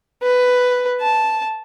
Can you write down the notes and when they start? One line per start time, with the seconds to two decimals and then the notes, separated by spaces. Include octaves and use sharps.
0.23 B4
1.01 A5